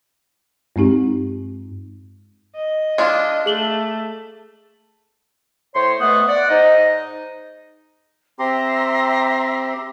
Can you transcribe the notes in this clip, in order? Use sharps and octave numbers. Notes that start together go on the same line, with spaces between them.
G2 G#3 C4 D#4 G4
D#5
G#3 D4 F4
A3 G#4 F#7 G7
A2 C5 C#5 C6
B2 A3 B3 F#5 D#6
D5 F#5
G#2 D#4 D#5
C4 G4 E5 A#5 C6